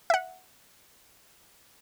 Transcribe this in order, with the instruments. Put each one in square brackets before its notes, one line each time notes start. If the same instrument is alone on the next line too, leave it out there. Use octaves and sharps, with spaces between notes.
[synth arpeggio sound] E5 F#5